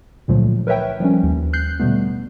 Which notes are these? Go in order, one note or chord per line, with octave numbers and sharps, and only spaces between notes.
C#2 A#2 D3 F3 F#3 A3
A#4 B4 C#5 E5 G5
F3 G3 C#4
D#2
F#6 G6 C7
B2 D3 G3 A3 B3